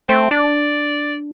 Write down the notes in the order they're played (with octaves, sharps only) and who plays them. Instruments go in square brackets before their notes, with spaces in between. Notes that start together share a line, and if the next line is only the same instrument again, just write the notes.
[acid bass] A3 [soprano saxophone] C4
[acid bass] D4 [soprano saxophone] D5